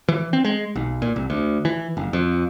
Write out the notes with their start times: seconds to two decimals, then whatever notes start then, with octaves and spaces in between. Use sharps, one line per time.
0.08 E3
0.33 C4
0.45 G#3
0.76 B1
1.02 A#2
1.16 C2
1.30 D2
1.65 E3
1.97 F#1
2.13 F2